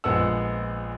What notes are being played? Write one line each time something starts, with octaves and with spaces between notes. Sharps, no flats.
A#1 F3 G#3 B3 F#5 E6